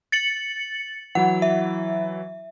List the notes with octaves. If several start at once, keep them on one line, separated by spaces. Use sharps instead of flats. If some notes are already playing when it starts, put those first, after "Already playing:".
A6 C#7 F#7
E3 F#3 E4 F#5
E5